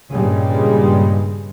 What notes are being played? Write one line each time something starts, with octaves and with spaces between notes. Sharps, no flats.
G2 A#2 C#3 G3 G#3